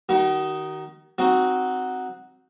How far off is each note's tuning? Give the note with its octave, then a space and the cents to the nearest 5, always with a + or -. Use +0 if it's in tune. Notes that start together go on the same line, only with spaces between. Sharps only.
D#3 +0 D#4 +0 F#4 +40
C4 +0 D#4 +0 F#4 +0